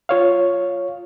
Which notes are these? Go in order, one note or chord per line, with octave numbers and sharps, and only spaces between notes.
F4 C#5 F5